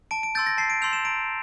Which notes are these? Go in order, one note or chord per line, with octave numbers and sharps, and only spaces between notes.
A5 D7
D7
C6 E6 G6 A6
A#6
A5 C7
D7
C6 E6 G6 F7
E7
A#5 D7